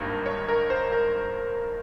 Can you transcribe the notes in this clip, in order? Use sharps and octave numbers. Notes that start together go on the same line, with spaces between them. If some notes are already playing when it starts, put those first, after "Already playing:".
Already playing: G#1 G2 D#3 A#3 A#4
C#5
A#4
C5
A#4